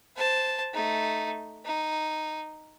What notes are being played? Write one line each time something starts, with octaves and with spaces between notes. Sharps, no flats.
C5 A5
A3 D#4
D#4